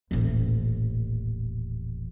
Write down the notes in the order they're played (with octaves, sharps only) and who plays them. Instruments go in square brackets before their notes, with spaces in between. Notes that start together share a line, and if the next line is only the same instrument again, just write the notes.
[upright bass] D#1 A1